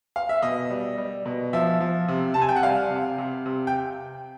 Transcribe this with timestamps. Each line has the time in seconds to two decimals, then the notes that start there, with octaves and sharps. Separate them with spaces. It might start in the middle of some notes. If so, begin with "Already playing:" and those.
0.16 F5
0.29 E5
0.42 B2 D#5
0.70 G3
0.98 G3
1.26 B2
1.53 F3 E5
1.80 F3
2.08 C3
2.34 C3 A5
2.42 G#5
2.49 G5
2.56 F#5
2.63 G3 F5
2.91 C3
3.18 C3
3.46 C3
3.67 G5